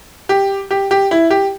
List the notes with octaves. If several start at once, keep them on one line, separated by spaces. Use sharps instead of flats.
G4
G4
G4
E4
G4